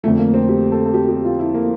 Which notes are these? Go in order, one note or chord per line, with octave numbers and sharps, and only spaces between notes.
F2 D3 F3 A3
A#3
C4
G4
A4
A4
G4
G4
F4
E4
A#3